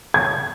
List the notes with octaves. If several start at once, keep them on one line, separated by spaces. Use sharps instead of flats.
G#6